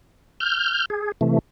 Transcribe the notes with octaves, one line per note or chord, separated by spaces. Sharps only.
F6 G6
G#4
C3 E3 A3